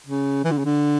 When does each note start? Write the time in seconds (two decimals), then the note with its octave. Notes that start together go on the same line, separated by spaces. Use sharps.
0.06 C#3
0.44 E3
0.51 D3
0.58 C#3
0.65 D3